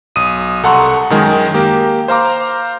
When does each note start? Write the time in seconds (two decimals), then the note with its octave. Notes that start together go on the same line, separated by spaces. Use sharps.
0.16 B1 D#6 D#7
0.63 C2 A4 F#5 A#5 C6 C#6
1.10 F#2 D#3 G#3
1.54 A#3 G4
2.08 C5 F5 A#5 D6